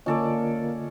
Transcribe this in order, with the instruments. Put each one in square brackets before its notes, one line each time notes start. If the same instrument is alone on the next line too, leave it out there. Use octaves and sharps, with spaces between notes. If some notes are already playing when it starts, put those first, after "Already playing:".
[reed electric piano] D3 F4 D#5 [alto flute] A#3 [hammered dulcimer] C#4 A4 D5